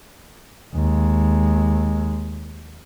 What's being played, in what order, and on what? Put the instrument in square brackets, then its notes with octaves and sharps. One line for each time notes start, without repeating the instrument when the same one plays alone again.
[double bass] D#2 G#3